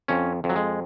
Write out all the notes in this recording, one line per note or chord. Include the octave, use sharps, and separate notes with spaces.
F2 C#4
F2
F#3
G#3